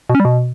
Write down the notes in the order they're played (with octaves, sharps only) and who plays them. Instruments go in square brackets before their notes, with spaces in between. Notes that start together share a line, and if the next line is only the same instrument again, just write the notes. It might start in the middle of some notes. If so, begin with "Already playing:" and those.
[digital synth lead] B2
C#4
G3
B2